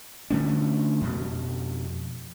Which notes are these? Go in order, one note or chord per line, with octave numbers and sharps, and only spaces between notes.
D3 A3 C#4
F2 B2